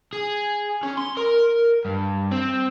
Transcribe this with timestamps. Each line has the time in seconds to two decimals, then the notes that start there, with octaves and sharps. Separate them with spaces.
0.13 G#4
0.83 C#4
0.97 C6
1.17 A#4
1.85 G2
2.32 C4